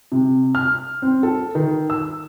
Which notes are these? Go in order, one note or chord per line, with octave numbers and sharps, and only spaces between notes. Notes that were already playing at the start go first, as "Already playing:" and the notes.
C3
F6
C4
A4
D#3
E6